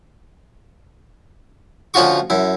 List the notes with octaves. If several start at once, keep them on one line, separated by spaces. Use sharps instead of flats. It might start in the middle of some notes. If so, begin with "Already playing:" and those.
D2 F3 C#4 F4 F#4 C#6
F#2 E4